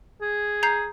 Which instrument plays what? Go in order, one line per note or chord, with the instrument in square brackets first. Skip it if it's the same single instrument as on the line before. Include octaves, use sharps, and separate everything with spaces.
[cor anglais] G#4
[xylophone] A#5 G6 C7